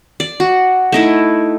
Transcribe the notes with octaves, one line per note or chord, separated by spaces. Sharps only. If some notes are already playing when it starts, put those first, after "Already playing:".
D5
F#4
A3 D#4 E4